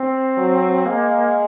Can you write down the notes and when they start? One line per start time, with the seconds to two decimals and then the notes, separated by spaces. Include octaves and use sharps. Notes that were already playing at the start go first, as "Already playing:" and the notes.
Already playing: C4
0.37 F#3
0.85 G#3 A#3